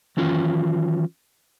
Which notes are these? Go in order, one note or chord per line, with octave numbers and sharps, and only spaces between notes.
D#3 E3 F#3 C#4 F4